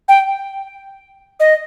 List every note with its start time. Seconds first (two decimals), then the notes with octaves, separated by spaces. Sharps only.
0.08 G5
1.40 D#5